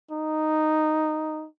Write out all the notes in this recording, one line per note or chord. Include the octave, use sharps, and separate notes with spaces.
D#4